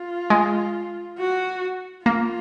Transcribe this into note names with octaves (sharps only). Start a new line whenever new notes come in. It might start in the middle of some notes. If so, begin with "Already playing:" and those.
Already playing: F4
G#3
F#4
A#3 F4